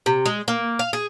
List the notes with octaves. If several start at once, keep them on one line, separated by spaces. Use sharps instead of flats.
C3
G#3
A#3
F5
G#4